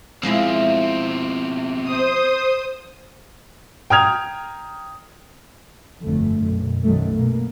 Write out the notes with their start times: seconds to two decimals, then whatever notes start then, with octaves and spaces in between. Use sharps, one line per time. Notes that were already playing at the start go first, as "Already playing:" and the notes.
0.23 B2 F3 G#3 C4 E4
1.82 C5 D#6
3.90 G5 A#5 D#6 F6 G#6 F7
6.03 G1 F2 D3 A3
6.42 B1 F#2
6.83 B1 F#2 D#3 F#3 A3
7.13 B2 A#3